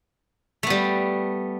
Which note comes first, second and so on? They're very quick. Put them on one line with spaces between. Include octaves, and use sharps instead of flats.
A3 B3 G3